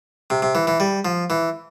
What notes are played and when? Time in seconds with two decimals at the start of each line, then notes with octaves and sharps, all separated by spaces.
0.30 C3
0.42 C3
0.55 E3
0.67 E3
0.80 G3
1.05 F3
1.30 E3